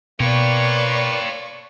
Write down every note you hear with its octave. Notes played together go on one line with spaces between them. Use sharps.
B2 A#3 B4 C#5 D5 G5 C6 C#6